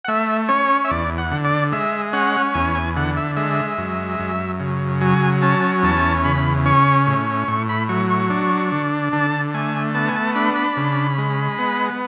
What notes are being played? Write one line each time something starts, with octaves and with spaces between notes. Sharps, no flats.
F#5
A3 E5
C#4 C#5
E5
E2 D5
F#5
D3
D5
G#3 E5
C#4 F#5
E2 G#5
G#5
D3 F#5
E5
G#3 E5
F#2
F#2
C#3
F#3 G#5
C#4 A5
E2 A5
C#3 B5
C#4 C#6
A2
A2 C#6
B5
F#3 C#6
C#6
D4
D3
D3 A5
A3 G#5
B3 A5
G#5
A5
D4 B5
B5
C#3
G#3
B3